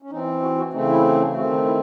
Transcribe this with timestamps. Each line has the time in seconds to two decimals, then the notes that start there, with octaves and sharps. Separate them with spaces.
0.02 C#4
0.10 E3 C4 D#4
0.42 F#4
0.58 F#4
0.73 C#3 E3 A3 C4 D#4
0.88 E4
1.35 D#3 A3 C4 F#4
1.51 D#4
1.66 E4